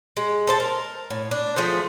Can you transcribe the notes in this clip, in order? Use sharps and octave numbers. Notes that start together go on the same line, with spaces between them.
G#3
A4 C5 A5
A#4
A2
D4
F3 A3 G#4 C5